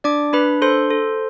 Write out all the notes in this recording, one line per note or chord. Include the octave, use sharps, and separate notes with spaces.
D4 D5 D6
D4 B4 B5
A4 C5 C6
A4